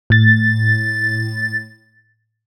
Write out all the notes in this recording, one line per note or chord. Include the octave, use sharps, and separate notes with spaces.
A2 A6